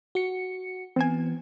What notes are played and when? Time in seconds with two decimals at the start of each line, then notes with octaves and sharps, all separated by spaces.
0.15 F#4 C#7
0.96 E3 B3 C4 G#5